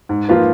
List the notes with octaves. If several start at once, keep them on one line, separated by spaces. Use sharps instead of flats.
G#2
F3 A#3 F4 B4